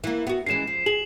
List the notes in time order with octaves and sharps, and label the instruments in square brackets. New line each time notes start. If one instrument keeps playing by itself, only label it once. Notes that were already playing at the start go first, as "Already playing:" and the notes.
[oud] E3 A#3
B3 F#4
[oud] E3 G#3 C#4 [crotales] C7 E7
[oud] F3
[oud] G#4 [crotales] F#7